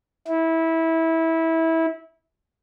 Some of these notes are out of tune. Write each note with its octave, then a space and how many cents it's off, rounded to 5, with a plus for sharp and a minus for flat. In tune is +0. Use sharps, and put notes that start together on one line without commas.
E4 -20